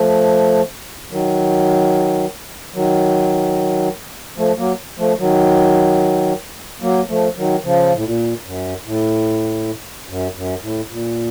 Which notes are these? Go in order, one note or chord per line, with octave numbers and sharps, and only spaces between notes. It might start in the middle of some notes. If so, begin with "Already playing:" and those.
Already playing: F3 A3
D#3 F#3
D#3 F#3
F3 A3
F#3 A#3
F3 A3
D#3 F#3
F#3 A#3
F3 A3
D#3 F#3
C#3 F3
A2
A#2
F#2
A2
F#2
F#2
A2
A#2